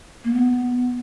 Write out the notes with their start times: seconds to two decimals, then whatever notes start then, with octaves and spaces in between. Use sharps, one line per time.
0.24 A#3
0.33 B3